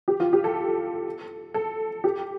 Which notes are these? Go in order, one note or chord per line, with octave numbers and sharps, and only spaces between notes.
G4
F4
G4
A4
A4
G4